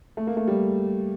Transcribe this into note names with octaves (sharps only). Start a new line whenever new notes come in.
A3
A#3
A3
G3